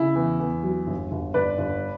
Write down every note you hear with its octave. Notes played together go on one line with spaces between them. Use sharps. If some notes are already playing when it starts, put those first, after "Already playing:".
Already playing: C#3 E4
E2
E2
F#3
G1
G1
G1 B4 D5
G1